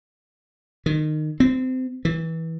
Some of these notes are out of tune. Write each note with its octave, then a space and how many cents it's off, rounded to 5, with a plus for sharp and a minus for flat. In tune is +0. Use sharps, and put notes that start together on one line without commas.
D#3 -20
C4 -25
E3 -20